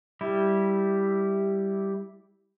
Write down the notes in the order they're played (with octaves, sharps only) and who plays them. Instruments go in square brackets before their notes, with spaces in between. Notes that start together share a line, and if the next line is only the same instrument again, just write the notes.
[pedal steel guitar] G3 E4